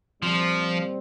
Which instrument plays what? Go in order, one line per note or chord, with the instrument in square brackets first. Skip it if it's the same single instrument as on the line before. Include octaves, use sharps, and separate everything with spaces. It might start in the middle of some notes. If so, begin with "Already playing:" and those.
[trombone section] A#2 G3 C4 [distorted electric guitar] F3